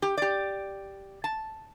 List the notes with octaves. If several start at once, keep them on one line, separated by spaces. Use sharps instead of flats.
G4
G4 D5
A5